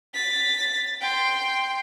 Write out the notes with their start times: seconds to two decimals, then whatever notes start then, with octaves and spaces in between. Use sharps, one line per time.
0.14 A6 B6
1.01 G5 C6